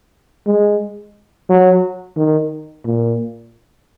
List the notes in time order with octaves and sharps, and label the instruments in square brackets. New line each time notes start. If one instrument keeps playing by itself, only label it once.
[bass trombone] G#3
F#3
D#3
A#2